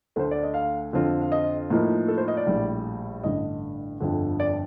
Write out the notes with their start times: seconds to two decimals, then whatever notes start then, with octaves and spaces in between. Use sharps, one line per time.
0.16 D2 D3 A3 C5
0.31 D5
0.43 D#5
0.54 F5
0.93 F2 D3 F3 C4 F4
1.21 F5
1.32 D#5
1.70 A2 F3 A#3 D#4
2.08 A4
2.18 C5
2.28 D#5
2.37 D5
2.46 A#1 A2 G3
3.24 A1 G2 D3 D#5
4.00 G1 F2 D3
4.40 D5